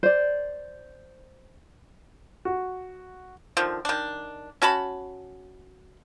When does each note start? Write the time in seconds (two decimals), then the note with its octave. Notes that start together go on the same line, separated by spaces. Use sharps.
0.03 C5 D5
2.45 F#4
3.57 D3 D#3 F3
3.85 D#3 D4
4.62 C#4 F#4 A5 B5